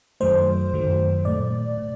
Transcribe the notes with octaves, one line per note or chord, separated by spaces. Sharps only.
F#2 D#3 F#3 A3 C5
F#2 D#3 F#3 A3
A#2 A3 D5
A#2